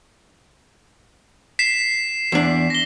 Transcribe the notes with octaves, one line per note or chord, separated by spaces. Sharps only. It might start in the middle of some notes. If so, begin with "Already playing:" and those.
B6 C7 E7
E2 D4
A#6 G7